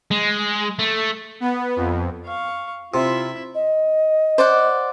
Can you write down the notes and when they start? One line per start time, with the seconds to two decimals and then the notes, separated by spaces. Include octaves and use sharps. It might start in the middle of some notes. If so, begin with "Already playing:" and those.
0.11 G#3
0.79 A3
1.40 B3
1.76 F2
2.25 F5 C#6
2.94 C3 E4 F4 E5
3.55 D#5
4.38 C5 D5 F#5